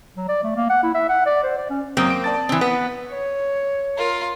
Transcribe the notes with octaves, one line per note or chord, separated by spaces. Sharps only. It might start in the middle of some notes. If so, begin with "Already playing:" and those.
F#3
D5
A3
A#3
F#5
E4
E5
F#5
D5
C5
D5
C#4
F#2 F#3 A#3 C4 D#6
D7
D5 A5 A6
E3 C4
B3 B4
C#5
F4 A#4